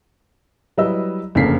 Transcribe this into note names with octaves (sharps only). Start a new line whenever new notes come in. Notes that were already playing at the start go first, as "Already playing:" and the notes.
F#3 G3 E4 B4 D#5 E6
F#1 F2 D3 A#3 B6 C7